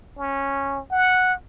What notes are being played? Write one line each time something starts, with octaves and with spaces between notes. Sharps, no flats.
C#4
F#5